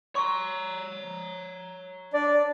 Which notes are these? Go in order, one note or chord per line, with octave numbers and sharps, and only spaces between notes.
C#5 A#5 C6 C#6
D4 D5